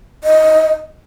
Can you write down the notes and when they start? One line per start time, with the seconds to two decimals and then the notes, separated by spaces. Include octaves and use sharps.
0.24 D#5